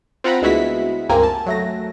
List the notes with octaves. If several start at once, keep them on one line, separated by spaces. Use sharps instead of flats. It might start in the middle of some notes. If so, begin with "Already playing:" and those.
C4 F4 F#5 A#5 B5
D2 G#3 B3 E4 F#4 B6
C#2 G2 A#3 C4 G#5 A#5
A5
F#3 A3 A#6